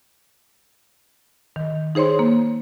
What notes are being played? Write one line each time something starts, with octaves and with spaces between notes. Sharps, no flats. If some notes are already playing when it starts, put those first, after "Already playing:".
D#3
D#4 G#4 C5 C#5 C6
A#3